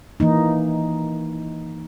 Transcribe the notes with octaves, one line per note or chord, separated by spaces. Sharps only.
E3 A#3 D#4